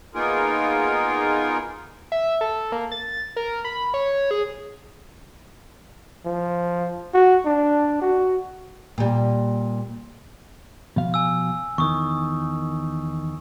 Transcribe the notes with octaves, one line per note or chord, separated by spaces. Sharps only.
A#3 B3 D#4 F4 G#4 A#4
E5
A4
A#3
A6
A#4
B5
C#5
G#4
F3
F#4
D4
F#4
A#2 G3
B2 F3 F5
G#5 E6
E2 D#3 C#6 D#6